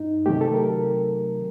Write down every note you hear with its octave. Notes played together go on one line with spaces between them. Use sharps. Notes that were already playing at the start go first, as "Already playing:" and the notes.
Already playing: G2 D#4
C3 D#3 F#3 A3 G4
A4
A#4